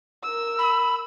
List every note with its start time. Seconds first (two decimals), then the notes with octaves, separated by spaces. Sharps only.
0.23 A#4 E6
0.59 B5